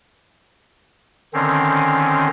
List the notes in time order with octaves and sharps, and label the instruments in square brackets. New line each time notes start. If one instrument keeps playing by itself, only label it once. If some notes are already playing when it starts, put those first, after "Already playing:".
[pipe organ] D3 D#3 C4 C#4